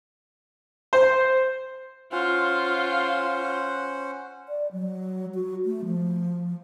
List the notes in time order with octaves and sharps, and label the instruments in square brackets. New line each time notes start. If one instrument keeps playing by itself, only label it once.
[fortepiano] C5
[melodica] C#4 C5 F#5 [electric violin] F4
[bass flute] D5
F#3
F#4
A3
F3